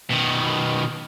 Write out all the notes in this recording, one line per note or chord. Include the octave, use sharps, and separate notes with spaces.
B2 D#3